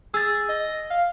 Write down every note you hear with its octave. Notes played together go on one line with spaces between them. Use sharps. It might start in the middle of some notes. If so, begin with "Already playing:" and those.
G#4 E6 A6
D#5
F5